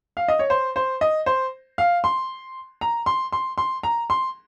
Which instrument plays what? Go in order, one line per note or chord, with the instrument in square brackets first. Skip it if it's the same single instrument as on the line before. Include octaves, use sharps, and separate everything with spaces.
[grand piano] F5
D#5
C#5
C5
C5
D#5
C5
F5
C6
A#5
C6
C6
C6
A#5
C6